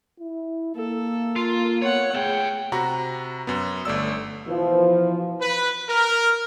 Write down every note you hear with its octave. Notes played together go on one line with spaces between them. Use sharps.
E4
A#3 A4
F4
B3 C#5 F#5
A3 G#4 G5
C3 F#4 A#5 B5
F#2 B3
G1 A3 D5 E6
B2 E3 F3
B4
A#4